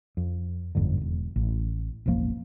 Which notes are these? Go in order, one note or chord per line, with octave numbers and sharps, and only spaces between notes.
F2
G1 F2 G#2 D3
E1
A1
E1 A1 F3 A#3